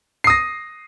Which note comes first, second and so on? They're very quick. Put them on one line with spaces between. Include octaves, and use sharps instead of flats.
C7 D#6 A#6